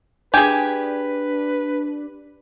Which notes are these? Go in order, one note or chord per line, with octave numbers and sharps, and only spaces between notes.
D4 G4 G#4 B4 G#5